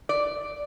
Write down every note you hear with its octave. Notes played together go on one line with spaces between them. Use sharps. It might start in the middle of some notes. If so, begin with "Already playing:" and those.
D5